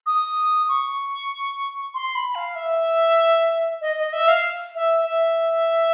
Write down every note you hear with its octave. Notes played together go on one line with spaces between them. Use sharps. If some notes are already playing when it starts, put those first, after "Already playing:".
D#6
C#6
C6
B5
F5
E5
D#5
D#5
E5
F5
E5
E5